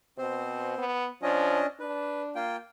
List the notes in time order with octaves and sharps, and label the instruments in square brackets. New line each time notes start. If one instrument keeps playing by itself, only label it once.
[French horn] B2 [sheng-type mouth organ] C4 C5
[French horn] B3
[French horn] F3 [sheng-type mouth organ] C#4 D4 D#5
[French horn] D4 [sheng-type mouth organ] B4
[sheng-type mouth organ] A#3 F4 G5